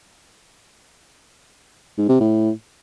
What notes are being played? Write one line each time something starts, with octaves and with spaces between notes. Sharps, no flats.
G#2
C3
A2